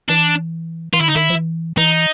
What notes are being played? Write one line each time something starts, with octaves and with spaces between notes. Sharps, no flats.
E3 D4
E3 F4
D#3 E4
D3 D#4
D#3 E4
F3
E3
E3 D#4